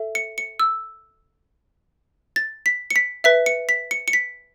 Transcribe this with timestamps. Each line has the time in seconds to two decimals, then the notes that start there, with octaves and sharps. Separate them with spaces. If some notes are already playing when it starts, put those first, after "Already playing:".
Already playing: A4 E5
0.15 C#7
0.38 C#7
0.60 E6
2.36 A6
2.66 B6
2.90 C#7
2.96 B6
3.24 B4 E5 B6
3.46 C#7
3.69 B6
3.91 C#7
4.08 C#7
4.13 B6